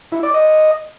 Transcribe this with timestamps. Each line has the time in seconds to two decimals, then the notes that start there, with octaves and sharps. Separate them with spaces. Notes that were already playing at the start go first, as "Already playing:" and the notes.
0.12 E4
0.23 D5
0.34 D#5